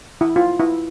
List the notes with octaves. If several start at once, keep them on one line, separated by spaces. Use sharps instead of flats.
E4
F4
E4